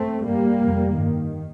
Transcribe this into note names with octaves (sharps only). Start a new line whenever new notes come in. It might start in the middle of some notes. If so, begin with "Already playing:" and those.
Already playing: A3 C4
G2 G3 A#3
F2 C3
G2 D#3